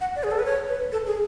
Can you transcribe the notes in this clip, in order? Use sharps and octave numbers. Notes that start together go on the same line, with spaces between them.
F#5
D5
G#4
A4
B4
C#5
B4
A4
G#4